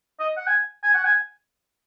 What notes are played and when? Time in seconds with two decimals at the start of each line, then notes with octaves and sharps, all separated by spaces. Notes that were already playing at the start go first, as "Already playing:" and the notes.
0.20 D#5
0.37 F#5
0.47 G#5
0.83 G#5
0.94 F#5
1.05 G#5